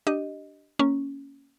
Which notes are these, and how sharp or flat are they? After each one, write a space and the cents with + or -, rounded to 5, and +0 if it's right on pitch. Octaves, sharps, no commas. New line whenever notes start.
D4 +0 G4 -15 D#5 +0
A#3 -10 C#4 +0